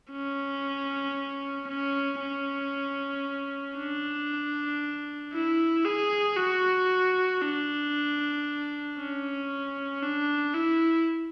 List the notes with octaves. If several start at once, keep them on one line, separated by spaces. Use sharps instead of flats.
C#4
C#4
C#4
D4
E4
G#4
F#4
D4
C#4
D4
E4